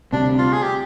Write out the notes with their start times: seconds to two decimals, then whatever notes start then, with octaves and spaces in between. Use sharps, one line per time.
0.12 D2 C3 G3 C4 D4
0.38 F4
0.53 G#4
0.62 G4